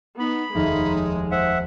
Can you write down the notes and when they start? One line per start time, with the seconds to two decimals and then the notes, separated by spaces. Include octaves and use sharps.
0.20 B3 D#4 B5
0.55 F1 D#2 G#3 D#4 F6
1.31 C5 E5 F#5